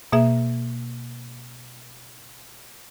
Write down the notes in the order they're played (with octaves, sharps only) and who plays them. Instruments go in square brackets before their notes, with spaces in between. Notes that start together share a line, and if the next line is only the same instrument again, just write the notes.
[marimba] B2 A#3 G#4 E5